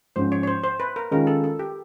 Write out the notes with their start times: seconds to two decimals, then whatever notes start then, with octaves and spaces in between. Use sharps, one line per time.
0.16 G#2 F3 G#3 C#4 C5
0.32 C#5
0.43 C#5
0.48 C5
0.64 C5
0.80 B4
0.96 A#4
1.11 D#3 G#3 C#4 F4 G#4 A#4
1.27 A4
1.44 A4
1.59 G4